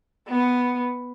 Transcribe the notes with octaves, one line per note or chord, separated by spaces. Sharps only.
B3